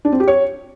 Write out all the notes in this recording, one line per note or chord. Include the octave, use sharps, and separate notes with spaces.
D4
C4
G4
C#5